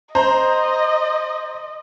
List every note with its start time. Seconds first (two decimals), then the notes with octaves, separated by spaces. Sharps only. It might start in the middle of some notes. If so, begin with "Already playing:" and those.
0.15 C5 D#5 A#5